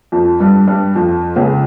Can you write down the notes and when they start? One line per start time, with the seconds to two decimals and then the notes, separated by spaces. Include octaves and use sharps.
0.12 F2 F3
0.40 G2 G3
0.67 G2 G3
0.95 F2 F3
1.36 C#2 C#3